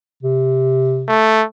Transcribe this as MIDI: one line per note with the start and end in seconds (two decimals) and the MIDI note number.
0.23 1.13 48
1.08 1.44 57